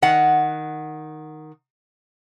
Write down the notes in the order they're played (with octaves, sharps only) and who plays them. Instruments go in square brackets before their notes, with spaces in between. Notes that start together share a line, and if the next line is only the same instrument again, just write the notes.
[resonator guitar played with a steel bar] D#3 F#5